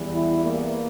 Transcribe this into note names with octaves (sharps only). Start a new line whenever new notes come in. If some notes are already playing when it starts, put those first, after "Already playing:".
Already playing: E2 E3 G3
E4
A#3